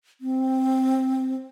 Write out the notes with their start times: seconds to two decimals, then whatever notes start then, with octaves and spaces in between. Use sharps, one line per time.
0.21 C4